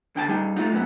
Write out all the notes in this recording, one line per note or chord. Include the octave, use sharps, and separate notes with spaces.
D3 G5 A5
G3 D#4
A3 D#4 F4
F#2 B3